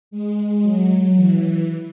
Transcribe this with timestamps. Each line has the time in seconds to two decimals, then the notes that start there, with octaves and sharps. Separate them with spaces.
0.11 G#3
0.62 F#3
1.16 E3